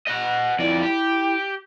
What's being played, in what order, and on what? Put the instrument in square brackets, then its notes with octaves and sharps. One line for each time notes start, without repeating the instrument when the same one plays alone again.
[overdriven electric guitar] D#5 F#5
[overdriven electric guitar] F2 D5 [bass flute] E4
[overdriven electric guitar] G4